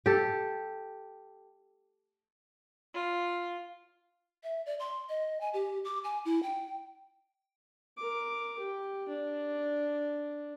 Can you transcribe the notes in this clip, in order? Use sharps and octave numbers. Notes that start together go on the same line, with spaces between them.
G4 A4
F4
E5
D5
C6
D#5
G#5
G4
D6
G#5
E4
G5
A#4 D6
G4
D4